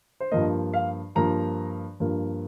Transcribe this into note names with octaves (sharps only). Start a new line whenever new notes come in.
C5
G2 F3 A#3 D#5
F5
G2 F3 A#3 A#5
G2 F3 A#3